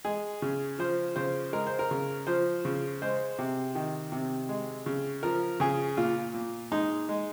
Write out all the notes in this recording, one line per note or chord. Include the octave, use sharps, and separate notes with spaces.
G#3 G#4
C#3
F3 C5
C#3 C5
G#3 A#4
C5
A#4
C#3
F3 C5
C#3
G#3 C5
C3
D#3
C3
G#3
C#3
F3 A#4
C#3 G#4
A#2 F4
A#2
G#3 D#4
G#3